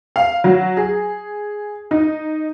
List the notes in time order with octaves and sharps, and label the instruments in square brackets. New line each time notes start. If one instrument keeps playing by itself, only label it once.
[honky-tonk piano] F5
F#3
G#4
D#4